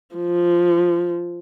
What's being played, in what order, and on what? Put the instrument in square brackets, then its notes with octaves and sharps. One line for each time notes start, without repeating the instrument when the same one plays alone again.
[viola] F3